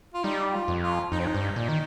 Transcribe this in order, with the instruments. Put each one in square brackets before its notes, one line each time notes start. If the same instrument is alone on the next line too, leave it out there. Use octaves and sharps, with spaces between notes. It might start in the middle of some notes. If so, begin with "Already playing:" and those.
[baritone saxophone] F4
[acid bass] G3 [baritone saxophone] D#4
[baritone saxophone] F4
[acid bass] F2
[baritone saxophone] F4
[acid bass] F2 [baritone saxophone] D#4
[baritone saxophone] C4
D#4
[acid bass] G2
A#2
D#3